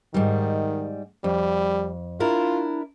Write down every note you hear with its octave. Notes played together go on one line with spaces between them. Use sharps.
G#2 D#3 G3
F2 G3
D4 E4 F4 A#4